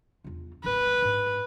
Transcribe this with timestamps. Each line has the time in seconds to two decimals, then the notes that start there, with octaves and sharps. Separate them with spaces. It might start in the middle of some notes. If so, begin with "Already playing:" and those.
0.24 E2 F4
0.64 D1 G#1 B4
1.02 G#2